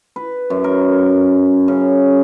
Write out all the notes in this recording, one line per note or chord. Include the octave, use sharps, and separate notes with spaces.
B4
F#2
A#4
C#3